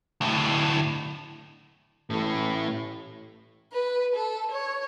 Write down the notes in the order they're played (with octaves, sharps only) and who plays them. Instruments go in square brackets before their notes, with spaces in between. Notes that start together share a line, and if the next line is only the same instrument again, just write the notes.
[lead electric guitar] D2 A2
[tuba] A1 [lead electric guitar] A2 A3
[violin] B4
A4
C#5